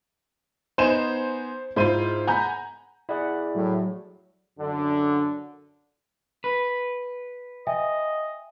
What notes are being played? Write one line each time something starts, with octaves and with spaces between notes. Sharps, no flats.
B3 D#4 C5 G#5 E7
G#2 E4 F4 C5 D#7
F#5 G#5 A#5 B5 G6
E4 G#4 D5 F#5
A2 F#3
F#2 D3
B4
D#5 E5 G5 G#5